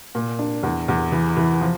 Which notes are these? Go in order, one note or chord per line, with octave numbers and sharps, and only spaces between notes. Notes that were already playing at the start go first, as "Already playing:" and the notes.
A#2
D4
E2
E2
E3
E3
F3